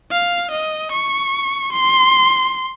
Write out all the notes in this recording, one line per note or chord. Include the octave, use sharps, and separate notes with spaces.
F5
D#5
C#6
C6